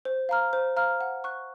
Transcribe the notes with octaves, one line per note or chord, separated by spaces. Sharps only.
C5
F5 A#5 F6
C5
F5 A#5 F6
F#5
C#6 F#6